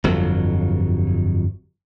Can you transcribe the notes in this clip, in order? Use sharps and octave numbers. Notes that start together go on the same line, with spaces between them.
G1 F2 F#3